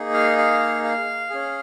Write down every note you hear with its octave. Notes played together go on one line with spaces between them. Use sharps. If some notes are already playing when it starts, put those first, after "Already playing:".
Already playing: A#3 D#4 G#4
F5
F5
F5
C#4 G#4